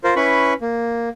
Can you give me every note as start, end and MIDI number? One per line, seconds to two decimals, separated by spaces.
0.04 0.14 65
0.04 0.14 70
0.04 0.14 72
0.16 0.54 61
0.16 0.54 64
0.16 0.54 71
0.16 0.54 83
0.16 0.54 85
0.61 1.09 58